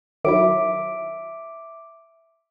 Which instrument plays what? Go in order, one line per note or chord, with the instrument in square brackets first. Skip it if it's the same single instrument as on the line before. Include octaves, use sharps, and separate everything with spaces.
[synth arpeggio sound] D#3 F#3 E4 [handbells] E5 D6 D7